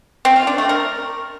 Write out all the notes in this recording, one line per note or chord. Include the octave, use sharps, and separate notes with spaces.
C4
F4
D4
A3
A#4